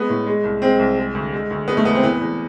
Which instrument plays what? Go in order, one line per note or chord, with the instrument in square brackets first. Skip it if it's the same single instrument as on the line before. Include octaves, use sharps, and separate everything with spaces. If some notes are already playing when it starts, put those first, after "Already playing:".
Already playing: [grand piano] G#3 B3
A2
G#3
C2
G#3 C4
C2
G#3
D2
G#3
D2
G#3 B3
A3
E2 B3
C4
E3 B3
E2